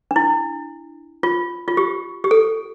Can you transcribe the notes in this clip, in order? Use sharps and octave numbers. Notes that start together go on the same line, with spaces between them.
D4
E4
F4
F4
G4
G4
A4